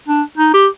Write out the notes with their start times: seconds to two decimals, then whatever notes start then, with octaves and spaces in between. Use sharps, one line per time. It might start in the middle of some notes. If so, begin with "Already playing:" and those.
0.08 D4
0.38 D#4
0.54 G4